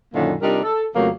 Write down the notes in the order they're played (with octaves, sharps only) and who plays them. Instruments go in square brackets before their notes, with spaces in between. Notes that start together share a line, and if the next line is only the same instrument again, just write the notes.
[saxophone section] F#2 A#2 D3 D#3 F#3 A#3
C3 G3 D4 D#4 F4 A#4
A4
F2 C#3 F3 F#3 A3 A#3